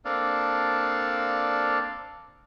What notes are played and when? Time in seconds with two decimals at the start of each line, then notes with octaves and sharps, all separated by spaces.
0.05 A#3 C4 D4 A4 D5 F5